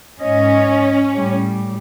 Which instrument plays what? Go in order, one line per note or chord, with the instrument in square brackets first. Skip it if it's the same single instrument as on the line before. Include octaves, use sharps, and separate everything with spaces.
[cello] G#2 D#5 [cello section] C#4
[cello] A2 G3